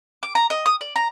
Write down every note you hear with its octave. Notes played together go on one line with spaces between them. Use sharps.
D6
A#5
D#5
D#6
D5
A#5